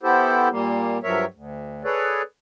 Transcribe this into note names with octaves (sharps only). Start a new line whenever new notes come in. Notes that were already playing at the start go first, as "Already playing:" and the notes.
B3 E4 G4 A4 C5
A#2 G3 A#3
G2 F3 F#3 A#4 C#5 E5
D2
G#4 A4 B4 C#5 D5